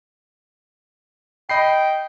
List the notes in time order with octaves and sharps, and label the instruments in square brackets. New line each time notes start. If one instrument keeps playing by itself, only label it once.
[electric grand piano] D#5 B5 C7 [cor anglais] G5